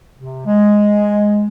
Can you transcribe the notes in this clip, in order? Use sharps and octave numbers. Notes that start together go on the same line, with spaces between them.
C3
G#3